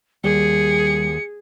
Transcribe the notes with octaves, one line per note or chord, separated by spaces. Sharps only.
D#2 G3 G#4 C#7